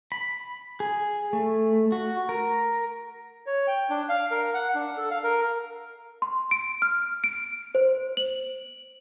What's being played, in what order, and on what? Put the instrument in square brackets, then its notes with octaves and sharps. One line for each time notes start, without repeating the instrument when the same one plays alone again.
[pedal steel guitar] B5
G#4
A3
F#4
A#4
[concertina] C#5
G5
D4
F5
A#4
F#5
D4
A4
F5
A#4
[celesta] C6
D7
F6
D7
C5
F#7